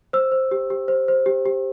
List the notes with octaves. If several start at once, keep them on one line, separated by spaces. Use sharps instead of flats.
C5 E6
C5
G4
G4
C5
C5
G4
G4